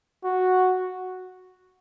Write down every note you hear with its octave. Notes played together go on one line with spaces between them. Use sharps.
F#4